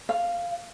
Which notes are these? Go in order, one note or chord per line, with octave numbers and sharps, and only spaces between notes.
F5